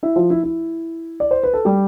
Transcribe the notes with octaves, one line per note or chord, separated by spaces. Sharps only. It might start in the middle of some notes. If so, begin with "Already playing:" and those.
E4 E5
F3 F4
E4
E4
D5
C5
B4
A4
G3 G4